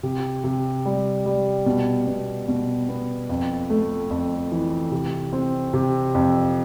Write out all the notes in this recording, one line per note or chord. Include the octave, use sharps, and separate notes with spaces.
C3
C3
G3
G3
B2
B2
B2
B3
F2
A3
F2
E3
C3
C4
C3
F2